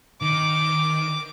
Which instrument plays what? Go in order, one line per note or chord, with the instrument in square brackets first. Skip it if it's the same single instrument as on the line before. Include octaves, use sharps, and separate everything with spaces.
[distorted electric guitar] D#3 [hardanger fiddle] D6